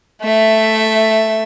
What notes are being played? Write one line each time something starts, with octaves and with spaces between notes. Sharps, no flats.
A3 E5